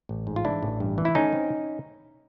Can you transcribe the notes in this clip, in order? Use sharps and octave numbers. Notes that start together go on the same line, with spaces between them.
A1
G#2
F4
E3 D4 E4
A1
G2
E3
E4
A3 C#4 D#4
C4